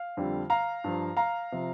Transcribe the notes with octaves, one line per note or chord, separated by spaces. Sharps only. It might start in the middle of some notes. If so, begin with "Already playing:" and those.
Already playing: F5
F2 D3 G3
F5 A#5
G2 F3
F5 A#5
C3 F3